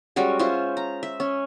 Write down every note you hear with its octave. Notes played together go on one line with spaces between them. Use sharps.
G3 G#3 C#4 F#4
C#4 F4 C5 E5
A#5
E5
C#4